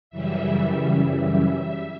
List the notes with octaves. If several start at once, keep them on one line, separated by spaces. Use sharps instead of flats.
F#2 C#3 E3 G3 E5